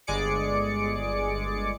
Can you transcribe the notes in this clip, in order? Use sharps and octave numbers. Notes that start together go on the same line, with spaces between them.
G1 G#3 G#4 D5 D6 C#7